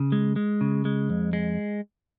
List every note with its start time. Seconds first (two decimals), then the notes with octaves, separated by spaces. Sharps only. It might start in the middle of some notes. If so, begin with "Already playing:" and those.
Already playing: C#3
0.12 G#3
0.36 G#3
0.61 C#3
0.85 G#3
1.09 F2
1.33 G#3